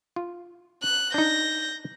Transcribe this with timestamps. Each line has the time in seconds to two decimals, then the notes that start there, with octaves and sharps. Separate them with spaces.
0.16 F4
0.83 F#6
1.14 D4 D#4 G6 A#6